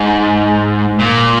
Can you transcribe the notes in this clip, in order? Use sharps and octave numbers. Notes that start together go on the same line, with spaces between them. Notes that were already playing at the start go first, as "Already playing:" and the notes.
Already playing: G#2
A#2